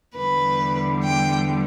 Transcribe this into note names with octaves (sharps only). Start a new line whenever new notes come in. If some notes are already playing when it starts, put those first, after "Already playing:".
E2 D3 G3 B4
G5